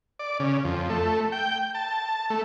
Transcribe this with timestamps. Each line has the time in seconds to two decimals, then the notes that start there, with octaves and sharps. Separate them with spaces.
0.19 D5
0.40 C#3
0.64 F2
0.90 A3
1.32 G5
1.75 A5
2.30 A3